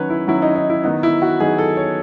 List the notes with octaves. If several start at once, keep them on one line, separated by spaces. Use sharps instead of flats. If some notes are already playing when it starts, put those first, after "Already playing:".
Already playing: D#3 F#3 C#4 B4 C#5
E4
D#3 F#3 C#4 E4
D#4
D#4
E4
D#3 F#3 B3 D#4
E4
F#4
D#3 F#3 B3 D#4 G#4
A4
C#5